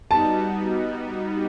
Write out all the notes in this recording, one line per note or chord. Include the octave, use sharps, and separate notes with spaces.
G3 B3 D#4 F#4 A5